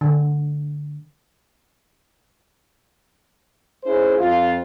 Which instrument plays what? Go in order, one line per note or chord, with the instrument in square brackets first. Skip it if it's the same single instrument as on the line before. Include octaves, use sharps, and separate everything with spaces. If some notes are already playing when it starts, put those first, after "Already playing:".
[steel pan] D3
[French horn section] C#4 E4 G#4 C5
F2 F4